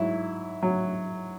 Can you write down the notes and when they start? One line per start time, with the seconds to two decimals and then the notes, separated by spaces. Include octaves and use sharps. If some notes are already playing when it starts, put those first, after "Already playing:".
Already playing: G#2 F#3 E4
0.63 F#3